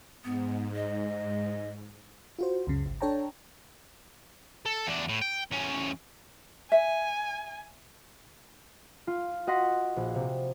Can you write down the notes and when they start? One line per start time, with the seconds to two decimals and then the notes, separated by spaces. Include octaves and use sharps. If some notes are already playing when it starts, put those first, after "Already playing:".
0.24 G#2 B3
0.75 D#5
2.39 F4 F#4 C5
2.67 C#2 F#2 C#3
2.86 G#1
3.01 D4 A4 C#5 G5 A5 A#5
4.66 A4
4.87 E2 D4
5.09 A2
5.22 G5
5.52 E2 C#4
6.72 E5 G#5
9.07 F4
9.47 F#4 D#5 F#5 C6 A#6 B6
9.96 A#1
10.15 C3